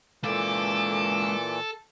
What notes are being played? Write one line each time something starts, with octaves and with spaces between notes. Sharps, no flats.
A#2 E3 G#3 A4 F5 D6